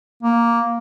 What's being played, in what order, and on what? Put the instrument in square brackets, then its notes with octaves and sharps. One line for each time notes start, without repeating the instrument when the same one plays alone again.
[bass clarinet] A#3